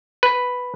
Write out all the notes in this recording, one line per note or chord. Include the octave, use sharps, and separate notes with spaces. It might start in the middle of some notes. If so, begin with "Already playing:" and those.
B4